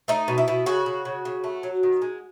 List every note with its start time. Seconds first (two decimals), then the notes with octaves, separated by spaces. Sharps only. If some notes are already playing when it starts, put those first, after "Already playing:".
0.08 A3 D#4
0.28 B2
0.38 E4
0.48 B2
0.66 C#3 F#4
0.86 C#3
1.05 C#3
1.25 C#3
1.44 A3
1.63 F#3
1.83 D#3
2.02 G#3